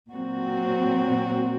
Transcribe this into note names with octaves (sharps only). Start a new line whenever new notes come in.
A#2 F#3 C4 F#4